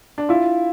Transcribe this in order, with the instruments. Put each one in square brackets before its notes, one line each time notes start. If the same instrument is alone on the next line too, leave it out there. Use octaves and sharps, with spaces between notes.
[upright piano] D4
[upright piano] E4 [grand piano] F4